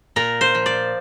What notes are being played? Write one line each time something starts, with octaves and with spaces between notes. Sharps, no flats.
A#2 A#4
C5
F3
D5